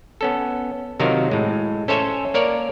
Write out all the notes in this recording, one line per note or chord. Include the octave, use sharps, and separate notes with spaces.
B3 C#4 A4
C3 D#3 F#3 F4 F#4 A#4
A2 G#3
C#4 A4 C5 C#5 E5 G#5
A#3 A#4 C#5 D5